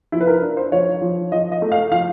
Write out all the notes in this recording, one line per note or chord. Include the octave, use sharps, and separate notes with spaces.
F3 E4
B4
A#4
D4
C5
F3 C#5
F3
F3 D#5
D#5
A3
F5
F3 F5